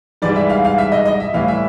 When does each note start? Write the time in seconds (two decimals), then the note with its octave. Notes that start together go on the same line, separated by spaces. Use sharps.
0.22 G#2 E3 G3 D5
0.36 E5
0.49 F5
0.64 F5
0.78 E5
0.92 D#5
1.05 D#5
1.20 E5
1.34 A2 E3 G3 F5
1.48 E5